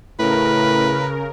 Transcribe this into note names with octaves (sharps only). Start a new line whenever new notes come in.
A2 C#3 A#4 B4